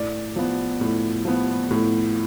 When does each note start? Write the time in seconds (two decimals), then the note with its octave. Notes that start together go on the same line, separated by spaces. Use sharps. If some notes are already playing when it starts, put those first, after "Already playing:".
Already playing: A2 D5
0.36 F3 B3
0.81 A2
1.25 F3 B3
1.71 A2